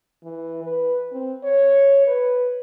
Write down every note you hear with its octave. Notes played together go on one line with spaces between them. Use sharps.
E3
B4
C4
C#5
B4